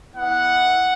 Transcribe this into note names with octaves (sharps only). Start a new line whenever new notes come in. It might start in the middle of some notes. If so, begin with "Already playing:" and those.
B3 E4 F#5